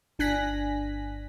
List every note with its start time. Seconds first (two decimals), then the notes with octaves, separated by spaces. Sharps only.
0.19 G1 D4 G#5 F#6 A#6 B6